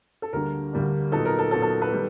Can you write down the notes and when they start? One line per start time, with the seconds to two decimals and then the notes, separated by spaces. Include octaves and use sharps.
0.22 A4
0.33 D2 D3 G3 A#3 D4 A#4
0.73 D2 D3 G3 A#3 D4
1.12 A#2 F#3 B3 D#4 A4
1.25 A#4
1.39 A4
1.51 A#2 F#3 B3 D#4 A4
1.62 A4
1.81 A4 B4
1.93 D#3 G3